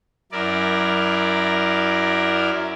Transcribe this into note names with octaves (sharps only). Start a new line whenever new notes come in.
F#2 E4 A#4 D5